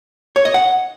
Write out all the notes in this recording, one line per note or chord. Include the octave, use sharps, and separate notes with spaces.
C#5
D#5
F#5